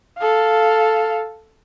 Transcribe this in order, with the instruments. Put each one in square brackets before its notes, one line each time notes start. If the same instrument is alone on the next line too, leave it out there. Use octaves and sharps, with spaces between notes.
[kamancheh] A4 F5